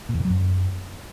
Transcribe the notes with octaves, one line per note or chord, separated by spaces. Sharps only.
A#2
E2
A#2
F#3
F#2